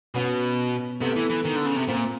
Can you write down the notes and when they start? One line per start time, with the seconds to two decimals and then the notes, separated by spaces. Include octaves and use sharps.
0.15 B2 B3 C#4
1.01 C3 A3 B3
1.16 E3
1.30 E3
1.45 D#3
1.56 D3
1.66 C#3
1.77 C3
1.88 A#2 A#3 C4